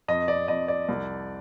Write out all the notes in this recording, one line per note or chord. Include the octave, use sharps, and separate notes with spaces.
F2 D#5
D5
F2 D#5
D5
C2